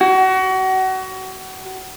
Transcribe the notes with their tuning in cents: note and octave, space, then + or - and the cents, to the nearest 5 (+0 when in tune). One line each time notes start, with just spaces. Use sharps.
F#4 +30